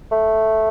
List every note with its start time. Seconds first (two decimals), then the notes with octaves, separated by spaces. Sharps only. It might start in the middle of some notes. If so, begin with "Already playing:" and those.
0.12 A3